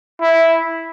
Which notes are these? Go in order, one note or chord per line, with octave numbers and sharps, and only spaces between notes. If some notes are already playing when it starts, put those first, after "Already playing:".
E4